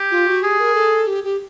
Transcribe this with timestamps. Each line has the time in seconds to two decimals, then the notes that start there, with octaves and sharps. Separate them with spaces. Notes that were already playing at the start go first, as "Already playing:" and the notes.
Already playing: G4
0.11 F4
0.27 F#4
0.43 G4 G#4
0.60 A#4
0.75 A4
1.07 G4
1.24 G4